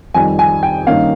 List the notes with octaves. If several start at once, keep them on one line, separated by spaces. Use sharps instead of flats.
F2 D#3 G3 G#5
G#5
G5
G2 D#3 A#3 C#4 F5